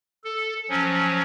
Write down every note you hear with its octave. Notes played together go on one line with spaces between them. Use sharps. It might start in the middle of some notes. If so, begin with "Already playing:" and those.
A4
F3 F#3 C#4